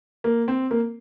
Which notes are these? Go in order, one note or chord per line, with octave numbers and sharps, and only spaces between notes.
A#3
C4
A#3